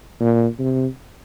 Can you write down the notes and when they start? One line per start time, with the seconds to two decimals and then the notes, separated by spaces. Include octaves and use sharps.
0.20 A#2
0.59 C3